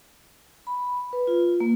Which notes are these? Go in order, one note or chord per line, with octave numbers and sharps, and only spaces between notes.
B5
B4
F4
A#3